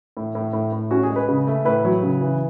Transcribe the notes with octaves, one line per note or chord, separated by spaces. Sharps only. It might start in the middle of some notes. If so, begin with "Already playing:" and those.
A2
A2
A2
A2
C#4 F#4
G#4
G#3
B4
C#3
A3
A2 B4
F#3
C#3
E3